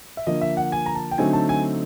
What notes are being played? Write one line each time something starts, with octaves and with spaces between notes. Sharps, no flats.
E5
D3 F3 A#3 D#5
E5
F#5
G#5
A#5
A5
G5
D3 F#3 A3 C4 D#4 G#5
A5
G#5